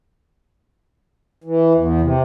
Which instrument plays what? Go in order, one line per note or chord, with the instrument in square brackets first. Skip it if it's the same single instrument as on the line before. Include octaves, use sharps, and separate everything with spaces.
[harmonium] E3
E2
C3